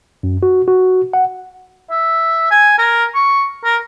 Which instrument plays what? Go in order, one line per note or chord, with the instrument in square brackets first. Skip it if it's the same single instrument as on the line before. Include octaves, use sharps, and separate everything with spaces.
[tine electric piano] F#2
F#4
F#4
F#5
[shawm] E5
G#5
A#4
C#6
A#4